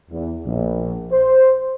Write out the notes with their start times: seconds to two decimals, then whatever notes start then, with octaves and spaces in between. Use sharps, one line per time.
0.11 E2
0.46 A#1
1.11 C5